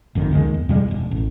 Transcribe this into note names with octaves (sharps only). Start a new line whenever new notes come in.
G#1 F2 D#3
C#2 D#3 G3 G#3
E2
E2 B2 G3 G#3
E1 D#2
A1